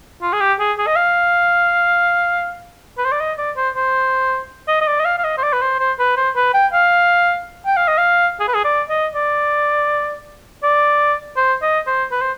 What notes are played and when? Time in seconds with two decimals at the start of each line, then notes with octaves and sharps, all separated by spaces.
0.22 F4
0.33 G#4
0.40 G4
0.60 G#4
0.78 G#4
0.87 D#5
0.96 F5
2.98 B4
3.05 C5
3.12 D5
3.20 D#5
3.38 D5
3.56 C5
3.75 C5
4.68 D#5
4.81 D#5
4.87 D5
4.99 D#5
5.05 F5
5.18 F5
5.24 D#5
5.38 C5
5.43 D5
5.53 B4
5.62 C5
5.79 C5
5.99 B4
6.17 C5
6.36 B4
6.54 G5
6.73 F5
7.66 G5
7.77 F5
7.88 D#5
7.98 F5
8.40 G#4
8.48 B4
8.54 G#4
8.64 D5
8.89 D#5
9.14 D5
10.63 D5
11.36 C5
11.62 D#5
11.87 C5
12.12 B4
12.21 C5